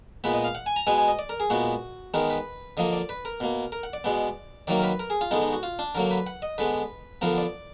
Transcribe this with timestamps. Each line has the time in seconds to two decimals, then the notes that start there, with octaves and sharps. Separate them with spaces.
0.24 A#2 G#3 B3 B4
0.34 D#5
0.44 F5
0.55 F#5
0.66 G#5
0.76 A#5
0.87 B2 G#3 B3 G#5
0.98 G#5
1.08 D#5
1.19 D5
1.29 A#4
1.40 G#4
1.50 A#2 G#3 B3 F#4
2.14 D#3 G#3 B3 A#4
2.30 B4
2.77 D3 F3 A#3 D#5
2.93 D5
3.09 B4
3.25 A#4
3.40 B2 A#3
3.72 A#4
3.83 F#5
3.93 D5
4.04 B2 G#3 B3
4.67 D#3 F#3 A#3 D5
4.79 A#4
4.83 B4
5.00 A#4
5.10 G#4
5.21 F4
5.31 D3 G#3 B3 D#4
5.42 D#4
5.53 F#4
5.63 F4
5.79 D4
5.95 D3 F#3 A#3 A#4
6.11 B4
6.27 F#5
6.42 D#5
6.58 D3 G#3 B3 B4
7.21 D3 F3 B3 A#4
7.38 D5